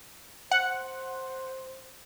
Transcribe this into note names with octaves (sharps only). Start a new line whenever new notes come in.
C5 F#5